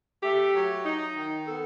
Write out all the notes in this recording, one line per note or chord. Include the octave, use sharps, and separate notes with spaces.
A3 G4
F#3
D#4
D#3
B3 A4